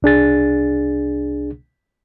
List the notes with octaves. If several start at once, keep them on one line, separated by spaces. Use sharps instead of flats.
C2 D4 G#4 A6